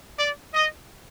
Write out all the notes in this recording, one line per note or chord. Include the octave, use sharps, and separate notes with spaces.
D5
D#5